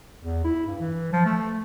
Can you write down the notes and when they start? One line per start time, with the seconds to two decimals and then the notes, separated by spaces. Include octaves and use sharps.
0.21 E2
0.44 E4
0.66 G2
0.80 E3
1.12 F3
1.25 A3